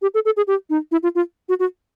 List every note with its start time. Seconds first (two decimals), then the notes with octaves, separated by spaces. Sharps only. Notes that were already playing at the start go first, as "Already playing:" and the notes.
0.02 G4
0.14 A4
0.25 A4
0.37 G#4
0.47 G4
0.70 D#4
0.92 E4
1.03 F4
1.15 F4
1.49 F#4
1.60 F#4